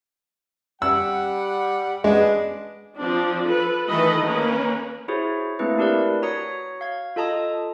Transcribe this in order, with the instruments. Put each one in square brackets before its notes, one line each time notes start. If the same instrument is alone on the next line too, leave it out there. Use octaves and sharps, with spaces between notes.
[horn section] G3 F#5 [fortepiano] E6
[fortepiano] G#3 [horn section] B3 D4 G#4
[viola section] F3 C4 D4
A4 B4
D#3 E3 A3 A4 B4 D#5
A#3 C#4 A#4 B4
[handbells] E4 F#4 G#4 C5 C#5
A3 A#3 C4 D4 E4 B4
D4 E4 G4 A#4 B4 D5
F#4 C#5 A#5 D#6 C#7
F5 G#6
F4 A4 D#5 A5 A#5 D#6